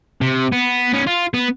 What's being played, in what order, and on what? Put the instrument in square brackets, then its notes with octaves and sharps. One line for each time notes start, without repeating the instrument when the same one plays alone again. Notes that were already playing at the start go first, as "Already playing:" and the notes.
[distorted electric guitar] C3
B3
B3 C#4
F4
B3